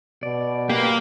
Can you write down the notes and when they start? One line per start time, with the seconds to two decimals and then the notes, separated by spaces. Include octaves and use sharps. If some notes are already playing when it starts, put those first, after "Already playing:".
0.23 B2 D5
0.69 A#3 G4 B4 F#6